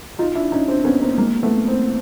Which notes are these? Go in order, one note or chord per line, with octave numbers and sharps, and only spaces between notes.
D#4 F4
D4 E4
C#4 D#4
C4 D4
B3 C#4
A#3 C4
G#3 A#3
A3 B3
A#3 C4